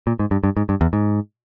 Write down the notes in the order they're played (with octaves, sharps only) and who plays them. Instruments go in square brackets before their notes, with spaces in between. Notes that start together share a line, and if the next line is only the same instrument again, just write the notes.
[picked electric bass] A#2
G#2
G2
G2
G#2
G2
E2
G#2